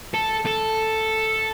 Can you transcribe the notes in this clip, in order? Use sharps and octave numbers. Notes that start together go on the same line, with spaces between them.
A4
A4